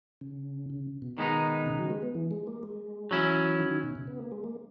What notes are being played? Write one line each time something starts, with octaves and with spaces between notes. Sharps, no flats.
C#3
C#3
B2
D#3 G#3 B3 D#4
C#3
F#3
G#3
B3
E3
G#3
A#3
G#3
E3 F#3 C#4 E4
D#3
D#3
B2
C#3
B3
A#3
G#3
A#3